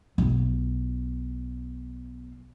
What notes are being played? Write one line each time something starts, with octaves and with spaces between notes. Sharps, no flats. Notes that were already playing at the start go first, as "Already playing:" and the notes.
B1 F4